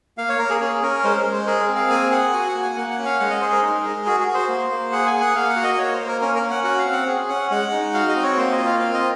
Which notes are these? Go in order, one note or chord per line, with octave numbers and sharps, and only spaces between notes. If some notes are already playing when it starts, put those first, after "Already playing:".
A#3 F5
C#5
A#3 A#4
G#4
A#4
C#4 G#4
C#4 A#4
G#3 C5
A#4
G#3
C5
G#4 A#4
C4
F5
A#3 G#5
G#4 F#5
F#4 G#5
F#5
A#3
G#5
A#3 F#5
F#5
C#4
F5
G#3 F#5
D#5
G#4 C5
A#4
D#4
G#3
F#4 G#4
G#4
F#4
C5
A#3
A#3
G#4 F#5
G#5
G#4
F#5
A#3 F5
F#5
F#4
D#5
A#3 C#5
C5
A#3
A#4
C#4 A#4
A#4
C#4
F#5
F#4 F#5
F5
C4
F#5
G#4
C#4 F#5
G#3 F#5
D#4
F#4 F5
D#5
C4
C#5
A#3 C5
D#5
F4
F5
C4 F5
D#5